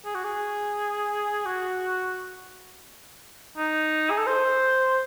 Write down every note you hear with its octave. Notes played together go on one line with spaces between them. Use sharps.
G#4
F#4
G#4
F#4
D#4
G#4
A4
C5